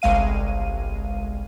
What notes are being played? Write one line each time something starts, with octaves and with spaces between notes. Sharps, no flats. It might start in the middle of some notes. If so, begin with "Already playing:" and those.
G1 C2 G#3 F5 D#7